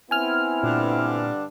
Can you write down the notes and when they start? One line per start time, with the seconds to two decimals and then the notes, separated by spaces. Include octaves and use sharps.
0.11 B3 C4 E4 G#5 F6
0.63 G2 A#2 D3 D4